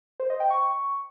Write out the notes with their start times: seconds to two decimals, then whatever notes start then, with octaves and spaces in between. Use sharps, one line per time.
0.20 C5
0.30 D#5
0.40 G5
0.50 C#6